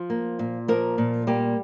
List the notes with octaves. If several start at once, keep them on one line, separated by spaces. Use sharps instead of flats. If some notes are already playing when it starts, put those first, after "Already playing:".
Already playing: F3 F4
A#3
A#2
F3 A#3 A#4
A#2
G3 A#3 G4